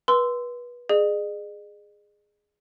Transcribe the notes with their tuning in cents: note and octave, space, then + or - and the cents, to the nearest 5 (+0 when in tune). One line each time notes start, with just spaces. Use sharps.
B4 -25 C6 -15 E6 +0
G#4 +0 D#5 -45